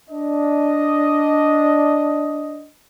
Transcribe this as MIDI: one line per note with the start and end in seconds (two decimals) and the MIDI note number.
0.10 2.68 62
0.10 2.68 75